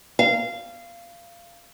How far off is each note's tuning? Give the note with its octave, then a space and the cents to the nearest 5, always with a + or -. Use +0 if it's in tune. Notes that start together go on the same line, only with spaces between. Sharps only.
F5 -20